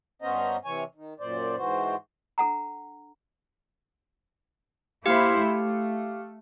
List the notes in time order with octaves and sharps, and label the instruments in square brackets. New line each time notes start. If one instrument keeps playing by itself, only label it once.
[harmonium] G2 B3 C#4 C5 D#5 A#5
C3 E3 C#5 G#5
D#3
F#2 A#2 C5 D5
G#2 E3 F#4 C5
[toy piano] D4 A4 F#5 A#5
[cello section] A#3 E4 C5 [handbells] G4 F5 F6
[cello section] A3